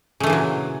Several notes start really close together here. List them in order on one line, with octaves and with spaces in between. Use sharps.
C#3 A3 E3 A#2 F#3